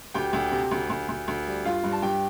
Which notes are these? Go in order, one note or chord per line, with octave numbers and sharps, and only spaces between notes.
D2 G4 G5
D2
C3
D2
D2
D2
D2
G3
G2 F4 F5
G2
A5
G2 G4 G5